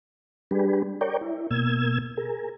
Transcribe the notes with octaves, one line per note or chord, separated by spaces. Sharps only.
G3 D4 G4 G#4 B4
A#4 C#5 D5 G5
E4
B2 A#3 E6 G#6
G#4 A#4